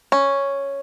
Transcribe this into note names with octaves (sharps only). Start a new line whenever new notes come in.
C#4